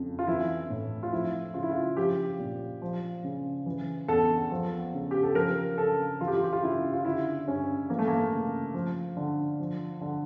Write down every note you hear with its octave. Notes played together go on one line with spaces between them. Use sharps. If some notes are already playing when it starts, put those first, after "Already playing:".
Already playing: F2 C#3
F4
E3 E4
A2
F4
F3 E4
C#3 F4
E4
F4
F3 G4
A#2
F3
C#3
E3
E2 A4
F3
C#3
G4
A4
F3 A#4
C#3 A4
E3 F4
G4
F4
G4
F4
C#3 E4
F4
D3 E4
G2 C#4
E3 A#3
A3
A#3
C#3
F3
D3
F3
D3